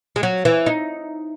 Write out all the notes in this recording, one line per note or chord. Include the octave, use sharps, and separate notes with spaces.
G#3
F#3
E3
D#4